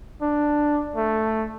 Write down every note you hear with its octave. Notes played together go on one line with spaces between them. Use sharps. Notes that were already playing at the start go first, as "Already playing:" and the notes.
D4
A3